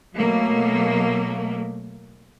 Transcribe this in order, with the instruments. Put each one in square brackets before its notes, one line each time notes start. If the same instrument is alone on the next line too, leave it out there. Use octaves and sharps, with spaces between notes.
[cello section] B2 F#3 A3 A#3